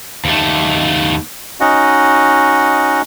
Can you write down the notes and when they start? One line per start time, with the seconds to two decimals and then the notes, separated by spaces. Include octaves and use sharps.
0.25 D#2 A3
1.60 C#4 D#4 F#4 D#5 F#5